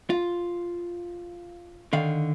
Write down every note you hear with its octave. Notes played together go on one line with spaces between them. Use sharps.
F4
D3 D#3 F5